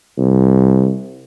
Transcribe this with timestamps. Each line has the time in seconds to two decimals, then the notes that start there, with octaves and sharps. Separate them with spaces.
0.18 C2